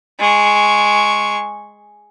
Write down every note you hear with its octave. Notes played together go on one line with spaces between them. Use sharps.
G#3 C#6